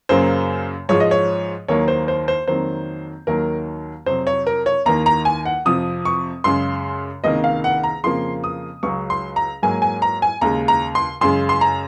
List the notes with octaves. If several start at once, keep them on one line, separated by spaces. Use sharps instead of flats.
F#2 C#3 F#3 A#3 C5
G#2 F3 G#3 C#5
D#5
C#5
D#2 D#3 F#3 A#3 C#5
C5
C5
C5
F2 D#3 F#3 A#3 C5
D#2 D#3 F#3 A#3 A#4
F2 C3 F#3 C5
C#5
A#4
C#5
D#2 D#3 A#3 A#5
A#5
G#5
F#5
F2 C3 F3 D#6
C#6
F#2 C#3 G#3 C6
C#2 C3 D#3 A#3 D#5
F5
F#5
A#5
F2 C#3 F3 A#3 C6
D#6
C#2 C#3 F#3 C#6
C6
A#5
G#2 F#3 A#3 G#5
G#5
A#5
G#5
D#2 C#3 G#3 A#5
A#5
C6
F#2 C#3 G#3 C6
C6
A#5